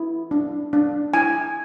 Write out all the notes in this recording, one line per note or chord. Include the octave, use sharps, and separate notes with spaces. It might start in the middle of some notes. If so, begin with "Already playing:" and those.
Already playing: E4
D4
D4
E4 G#5